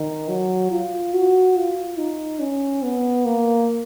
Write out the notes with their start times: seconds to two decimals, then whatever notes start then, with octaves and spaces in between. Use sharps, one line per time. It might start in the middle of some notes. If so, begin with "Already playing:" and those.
Already playing: D#3
0.29 F#3
0.71 F4
1.14 F#4
1.56 F4
1.98 D#4
2.41 C#4
2.83 B3
3.26 A#3